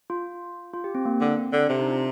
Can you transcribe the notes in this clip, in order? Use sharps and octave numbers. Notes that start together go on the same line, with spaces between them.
F4
F4
G4
C4
A#3
D3
C4
D3
C3 D4
D#4
F4